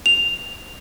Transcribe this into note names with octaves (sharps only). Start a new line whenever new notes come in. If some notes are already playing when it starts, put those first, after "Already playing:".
F7